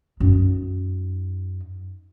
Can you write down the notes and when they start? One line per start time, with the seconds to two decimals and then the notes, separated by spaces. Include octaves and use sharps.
0.20 F#2 D#4